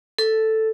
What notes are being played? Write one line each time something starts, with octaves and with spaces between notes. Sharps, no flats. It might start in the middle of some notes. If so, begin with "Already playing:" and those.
A4